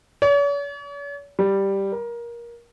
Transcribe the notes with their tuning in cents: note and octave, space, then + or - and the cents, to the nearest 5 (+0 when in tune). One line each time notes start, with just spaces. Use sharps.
C#5 +45
G3 +0
A#4 +20